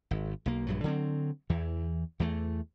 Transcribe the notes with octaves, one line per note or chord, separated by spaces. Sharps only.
G#1
B1 A#3
A#1 G2 F#3
D3 F#3 G3 C4
E2 E3
E2 E3 F3 A3